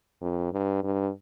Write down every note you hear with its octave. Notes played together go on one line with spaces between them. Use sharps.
F2
G2
G2